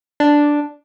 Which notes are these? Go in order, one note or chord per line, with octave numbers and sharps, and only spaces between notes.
D4